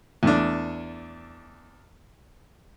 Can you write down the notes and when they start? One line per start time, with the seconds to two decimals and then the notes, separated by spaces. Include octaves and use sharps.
0.23 E2 A3 D4